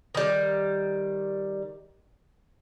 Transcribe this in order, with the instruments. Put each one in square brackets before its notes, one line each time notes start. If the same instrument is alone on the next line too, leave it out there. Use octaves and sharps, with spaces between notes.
[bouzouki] D#3 G3